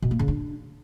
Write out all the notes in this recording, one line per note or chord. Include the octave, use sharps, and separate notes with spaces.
B2
A#3
C#3
D4